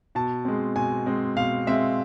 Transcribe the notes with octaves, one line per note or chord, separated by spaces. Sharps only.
B2 A5
G#3 C4
B2 G#5
G#3 C4
B2 F5
G#3 C4 E5